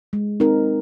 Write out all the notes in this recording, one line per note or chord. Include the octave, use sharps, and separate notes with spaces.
G#3
C4 D#4 A#4